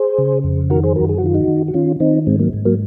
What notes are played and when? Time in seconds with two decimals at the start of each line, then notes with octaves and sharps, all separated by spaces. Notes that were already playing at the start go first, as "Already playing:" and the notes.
Already playing: G#4 C5
0.18 C#3
0.44 F2
0.70 D#3 F#4 A#4
0.83 G#4 C5
0.96 F#2 F#4 A#4
1.09 G#4
1.18 F#4
1.23 D#3 F4
1.34 D#4 F#4
1.48 D#3
1.68 F#4
1.74 D#3 C#4 F4
2.00 D#3 C4 D#4
2.27 G#2 G#3 C4
2.39 F#3 A#3
2.53 G#2
2.65 F#3 A#3